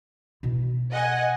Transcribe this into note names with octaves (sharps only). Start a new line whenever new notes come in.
B2 E4
D#5 F#5 G#5